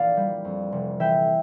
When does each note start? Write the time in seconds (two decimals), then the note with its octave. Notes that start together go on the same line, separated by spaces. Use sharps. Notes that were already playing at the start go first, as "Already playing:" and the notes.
Already playing: A#1 E3 D5 F5
0.17 G3
0.44 F2
0.72 F1
1.00 E3 E5 G5